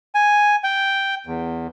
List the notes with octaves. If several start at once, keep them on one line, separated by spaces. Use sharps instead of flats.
G#5
G5
E2